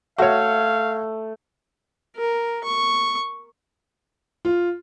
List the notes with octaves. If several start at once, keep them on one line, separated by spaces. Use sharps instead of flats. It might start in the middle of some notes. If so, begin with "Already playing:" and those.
A3 F#4 C#5 F5
A#4
C#6
F4